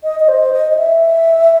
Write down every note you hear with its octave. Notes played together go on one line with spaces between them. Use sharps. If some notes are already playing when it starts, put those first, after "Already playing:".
D#5
D#5
C5
D#5
D#5
E5